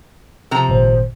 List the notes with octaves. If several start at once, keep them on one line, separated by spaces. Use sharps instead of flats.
C3 F3 A#5
G#1 A#2 C5